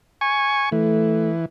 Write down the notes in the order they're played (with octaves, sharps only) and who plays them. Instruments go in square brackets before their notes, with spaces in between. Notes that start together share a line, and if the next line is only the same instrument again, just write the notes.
[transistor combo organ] G#5 C#6
[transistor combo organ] E3 [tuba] A3